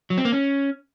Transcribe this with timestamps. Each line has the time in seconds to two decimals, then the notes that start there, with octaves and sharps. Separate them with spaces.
0.10 F#3
0.18 C4
0.25 A#3
0.32 C#4